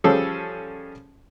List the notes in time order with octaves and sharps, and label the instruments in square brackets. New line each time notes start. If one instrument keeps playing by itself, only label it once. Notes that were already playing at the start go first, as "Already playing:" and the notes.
[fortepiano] F3 G3 C#4 G#4 A4